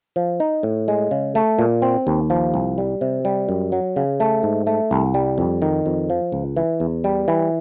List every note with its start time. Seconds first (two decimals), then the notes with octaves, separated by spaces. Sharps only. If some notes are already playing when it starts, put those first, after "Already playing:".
0.16 F3
0.40 D#4
0.63 A2
0.88 G#3
1.11 C#3
1.35 A3
1.59 A#2
1.82 C4
2.07 D#2
2.30 F3
2.54 C2
2.78 G3
3.01 C3
3.25 G3
3.49 F#2
3.72 F#3
3.96 C#3
4.20 A3
4.43 G#2
4.67 A3
4.91 C2
5.14 G3
5.38 F2
5.62 D#3
5.86 F2
6.10 F3
6.32 C#2
6.56 E3
6.80 E2
7.04 G3
7.28 E3